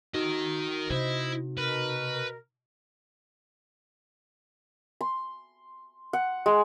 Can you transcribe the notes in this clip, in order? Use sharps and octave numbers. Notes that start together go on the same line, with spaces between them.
D#4 F#4 A#4 D#5
C3 E4 C5 D#5
B2 A#4 B4
C6
F#5
G#3